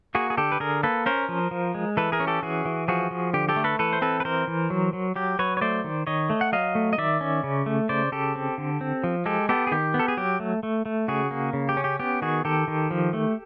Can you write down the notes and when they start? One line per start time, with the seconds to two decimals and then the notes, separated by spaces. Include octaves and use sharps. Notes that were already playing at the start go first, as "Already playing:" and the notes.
0.15 A#3 F#4 G#4
0.30 G#4
0.37 D3 G4 A4
0.52 B4
0.60 D3 G#4 A#4
0.83 A#3 A4 B4
1.06 C#4 A#4 C5
1.29 F3
1.51 F3
1.75 G#3
1.97 E3 A4 B4
2.12 G#4 A#4
2.20 C#4
2.27 G4 A4
2.43 E3 F#4 G#4
2.65 E3
2.88 F3 F#4 G#4
3.11 F3
3.34 D3 G4
3.49 G4 A4
3.56 A3
3.64 A4 B4
3.79 E3 A4 B4
3.93 C5
4.02 C4 A4 B4
4.20 B4
4.25 E3 A#4 C5
4.47 E3
4.70 F#3
4.93 F#3
5.16 F#3 G4
5.39 F#3 B4 C#5
5.57 C#5
5.61 A3 C5 D5
5.84 D#3
6.07 D#3 C#5 D#5
6.30 A3
6.41 F#5
6.52 F#3 D#5 F5
6.75 A3
6.93 D#5
6.98 D#3 D5 E5
7.21 C#4
7.44 C#3
7.66 A3
7.89 C#3 C5 D5
8.12 C#3 G4 A4
8.35 C4
8.58 D3
8.81 C4
9.04 F3
9.26 G#3 G4 A4
9.49 B3 G4 A4
9.67 G#4
9.72 D#3 G4
9.94 B3
9.99 A4
10.08 G#4
10.17 F#3 G4
10.40 A3
10.63 A3
10.86 A3
11.08 C#3 F#4 G#4
11.31 A#3
11.53 C#3
11.69 G4
11.77 C#4
11.84 G4
12.00 B3 G4
12.22 D#3 F#4 G#4
12.45 D#3 G4 A4
12.68 D#3
12.91 F3
13.13 A3